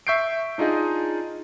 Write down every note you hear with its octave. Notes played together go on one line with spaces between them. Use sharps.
E5 C#6 G6 C7 D7
D4 D#4 F4 G#4 D#5